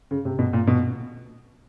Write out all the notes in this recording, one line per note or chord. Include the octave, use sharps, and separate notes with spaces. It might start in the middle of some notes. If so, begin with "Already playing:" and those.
C#3
C3
B2
A#2
B2